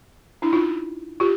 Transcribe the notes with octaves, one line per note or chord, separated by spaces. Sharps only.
D4 E4
D#4 F4
F4 G4